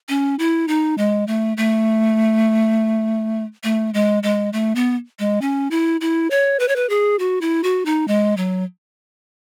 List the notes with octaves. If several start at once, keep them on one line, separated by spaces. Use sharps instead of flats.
C#4
E4
D#4
G#3
A3
A3
A3
G#3
G#3
A3
B3
G#3
C#4
E4
E4
C#5
B4
C#5
B4
G#4
F#4
E4
F#4
D#4
G#3
F#3